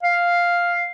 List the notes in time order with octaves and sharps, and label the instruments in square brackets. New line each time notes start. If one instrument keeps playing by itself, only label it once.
[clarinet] F5